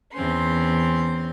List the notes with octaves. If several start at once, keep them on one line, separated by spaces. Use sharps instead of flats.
E2 C4 C#4 C6